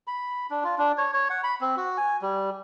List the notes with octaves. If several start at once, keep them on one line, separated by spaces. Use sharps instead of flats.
B5
D4
F4
D4
C#5
C#5
F#5
B5
C4
F#4
G#5
G3